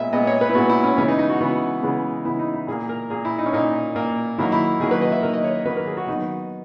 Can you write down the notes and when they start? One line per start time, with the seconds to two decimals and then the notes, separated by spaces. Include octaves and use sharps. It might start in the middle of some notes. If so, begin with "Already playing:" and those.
Already playing: A#2 G#3 B3 D#5 E5
0.13 A#2 G#3 B3 D#5
0.27 C#5
0.41 B4
0.49 E4
0.55 A#2 G#3 B3 F#4
0.69 E4
0.84 C#4
0.97 C#3 E3 G#3 B3 C#4
1.08 D#4
1.19 D#4
1.30 F#4
1.40 C#3 E3 G#3 B3 F#4
1.82 C#3 E3 G#3 B3
2.25 C#3 E3 G#3 B3 E4
2.39 D#4
2.54 E4
2.67 A#2 G#4
2.71 A#3
2.89 A#4
3.10 A#2 A#3 G#4
3.25 E4
3.38 D#4
3.46 C#4
3.53 A#2 A#3 D#4
3.95 A#2 A#3
4.38 D#3 F#3 A#3 E4
4.52 E4
4.80 D#3 F#3 A#3 G#4
4.91 B4
5.01 D#5
5.12 E5
5.23 D#3 F#3 A#3 A#4
5.33 D#5
5.44 C#5
5.65 D#3 F#3 A#3 B4
5.76 A#4
5.86 G#4
5.97 F#4
6.07 D#3 F#3 B3 D#4